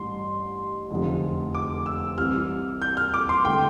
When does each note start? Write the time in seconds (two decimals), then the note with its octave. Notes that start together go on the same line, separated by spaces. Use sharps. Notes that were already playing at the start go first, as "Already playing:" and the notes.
Already playing: A1 G2 E3 C6
0.91 F1 E2 D3 F3
1.55 D6
1.86 E6
2.17 C2 C3 E3 F6
2.82 G6
2.97 F6
3.14 D6
3.29 C6
3.45 D3 A3 E4 G5